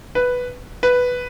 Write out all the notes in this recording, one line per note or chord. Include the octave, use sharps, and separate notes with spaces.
B4
B4